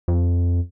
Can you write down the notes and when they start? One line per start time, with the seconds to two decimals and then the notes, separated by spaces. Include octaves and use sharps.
0.08 F2